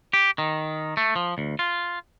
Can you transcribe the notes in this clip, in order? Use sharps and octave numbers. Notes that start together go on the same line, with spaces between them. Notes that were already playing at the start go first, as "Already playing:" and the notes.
G4
D#3
A3
F3
D2
F4